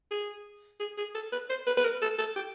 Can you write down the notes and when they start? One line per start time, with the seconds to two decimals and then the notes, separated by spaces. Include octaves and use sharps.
0.11 G#4
0.80 G#4
0.97 G#4
1.14 A4
1.32 B4
1.49 C5
1.66 B4
1.77 B4
1.84 A#4
2.02 A4
2.18 A4
2.36 G4